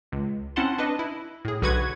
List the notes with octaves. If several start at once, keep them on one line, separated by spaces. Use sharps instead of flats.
C#2
C4 C#4 E4 F#5 A5 C6
D4 B4 D#5
E4
A2 G#4
B1 D3 F#4 B4 F#5 G#6